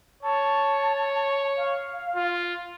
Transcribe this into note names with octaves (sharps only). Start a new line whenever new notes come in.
C#5 A5
F5
F4